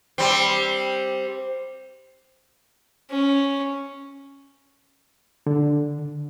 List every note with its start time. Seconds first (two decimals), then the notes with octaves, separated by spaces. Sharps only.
0.18 G3 C4
3.11 C#4
5.47 D3